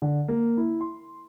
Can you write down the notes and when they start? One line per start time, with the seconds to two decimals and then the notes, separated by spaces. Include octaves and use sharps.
0.02 D3
0.28 A#3
0.57 E4
0.81 C6